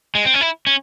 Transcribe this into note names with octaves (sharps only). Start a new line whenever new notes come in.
G#3
C4
C#4
E4
C#4